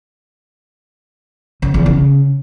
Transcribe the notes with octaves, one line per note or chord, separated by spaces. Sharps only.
C#3
E2
C#3